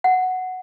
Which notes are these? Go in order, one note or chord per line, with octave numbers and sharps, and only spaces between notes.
F#5